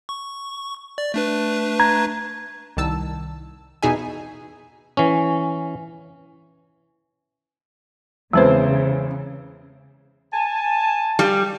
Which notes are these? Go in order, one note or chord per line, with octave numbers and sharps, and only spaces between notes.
C#6
D5
A3 D4 B4
A#5 G#6
C2 D#3 A5 E6
E2 B2 D#4 G#4 E5 G#5
E3 C#4
E2 C#3 G#3 C4 B4 C5
G#5 A5
G3